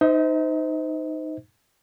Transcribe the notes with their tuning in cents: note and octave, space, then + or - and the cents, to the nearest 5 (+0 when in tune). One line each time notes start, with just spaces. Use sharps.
D#4 -5 C5 -25 D#5 +45